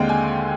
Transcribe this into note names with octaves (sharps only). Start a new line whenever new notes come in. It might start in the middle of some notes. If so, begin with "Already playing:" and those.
Already playing: D#2 D3 G#3 C4 F5 G5
G#5